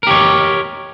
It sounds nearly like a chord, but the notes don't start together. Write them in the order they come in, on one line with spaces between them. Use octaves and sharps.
A#4 G4 C#5